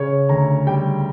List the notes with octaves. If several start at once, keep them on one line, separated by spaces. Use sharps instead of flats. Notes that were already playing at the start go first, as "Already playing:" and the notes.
Already playing: C#3 C#5
D2 A#5
G3 G5